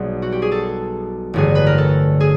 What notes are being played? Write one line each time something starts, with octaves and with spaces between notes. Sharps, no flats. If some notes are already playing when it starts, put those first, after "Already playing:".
Already playing: B1 B2 G3 G#4
F#4
G4
G#4
A4
A1 G2 D3 G#4
B4
A#4
A4
G#4